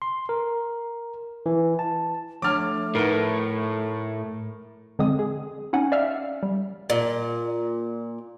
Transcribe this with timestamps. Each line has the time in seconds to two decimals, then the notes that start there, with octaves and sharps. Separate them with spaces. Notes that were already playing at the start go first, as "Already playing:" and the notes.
0.02 C6
0.29 A#4
1.46 E3
1.79 A5
2.42 F3 A3 D4 C#5 D6 F6
2.95 A2 D#4 A#4 B4 F#5
4.99 D3 G#3 C4 D#6
5.19 G#4
5.73 C#4 D#4 F#5 G#5
5.92 D5 E5 F5 F6
6.43 G3
6.90 A#2